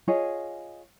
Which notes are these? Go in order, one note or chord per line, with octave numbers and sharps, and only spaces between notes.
F4 G#4 C#5 D#5